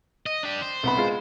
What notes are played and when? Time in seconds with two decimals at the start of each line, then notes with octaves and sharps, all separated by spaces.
0.26 D#5
0.43 D4 G4
0.62 C5
0.83 C2 B3 B5
0.97 G#3 F4